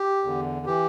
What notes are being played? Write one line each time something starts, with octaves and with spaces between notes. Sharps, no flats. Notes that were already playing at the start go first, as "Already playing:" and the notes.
Already playing: G4
E2 D3
E3 G4